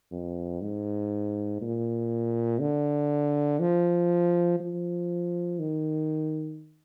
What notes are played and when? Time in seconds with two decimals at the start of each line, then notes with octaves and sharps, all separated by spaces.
0.12 F2
0.61 G#2
1.61 A#2
2.60 D3
3.60 F3
4.60 F3
5.59 D#3